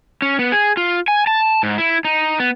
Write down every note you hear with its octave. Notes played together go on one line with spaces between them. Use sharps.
C#4
B3
G#4
F4
G#5
A5
G#2
E4
D#4
B3